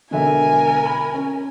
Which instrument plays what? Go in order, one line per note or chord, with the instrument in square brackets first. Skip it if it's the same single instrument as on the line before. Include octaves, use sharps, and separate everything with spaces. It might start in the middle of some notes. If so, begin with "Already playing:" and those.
[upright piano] E1 D3 E5 [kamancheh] A#4 G#5
[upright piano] B5
C#4